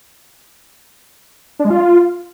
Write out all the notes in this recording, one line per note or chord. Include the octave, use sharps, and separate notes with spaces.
D4
G#3
F4